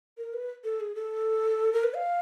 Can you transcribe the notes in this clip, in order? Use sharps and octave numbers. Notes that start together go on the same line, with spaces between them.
A#4
B4
A4
G#4
A4
A#4
B4
F5